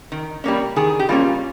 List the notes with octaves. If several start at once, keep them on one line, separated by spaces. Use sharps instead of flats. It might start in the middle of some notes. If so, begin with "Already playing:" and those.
D#3
G3 A#3 C#4
D#3 G#4
G4
G3 A#3 C#4 F4